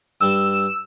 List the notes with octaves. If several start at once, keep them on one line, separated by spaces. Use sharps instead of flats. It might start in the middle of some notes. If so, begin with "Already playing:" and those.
G2 G3 E6